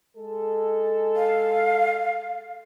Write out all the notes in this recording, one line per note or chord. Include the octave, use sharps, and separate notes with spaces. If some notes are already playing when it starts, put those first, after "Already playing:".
G#3 A4
F5